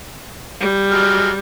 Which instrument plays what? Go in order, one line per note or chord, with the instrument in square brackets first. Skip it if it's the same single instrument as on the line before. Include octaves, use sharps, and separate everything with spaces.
[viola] G3
[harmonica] F#3 G#3 F6